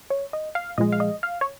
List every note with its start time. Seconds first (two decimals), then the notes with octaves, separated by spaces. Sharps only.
0.10 C#5
0.33 D#5
0.55 F5
0.78 A#2 F3 G#3 D#5
0.92 F5
1.00 D#5
1.23 F5
1.41 C#5